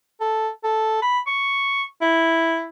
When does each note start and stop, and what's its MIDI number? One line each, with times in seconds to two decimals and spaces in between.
0.21 0.48 69
0.64 0.99 69
1.02 1.19 83
1.27 1.83 85
2.02 2.67 64